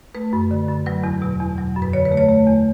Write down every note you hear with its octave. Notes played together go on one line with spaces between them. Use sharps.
A3 B4
F#2
D3
F#2
F#3 B4
E2
B2
E2
F#3
F#2
B4
D3 C#5
B4
A3
C#5
A3
E2